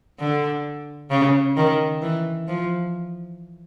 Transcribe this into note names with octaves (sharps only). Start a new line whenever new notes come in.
D3
C#3
D#3
E3
F3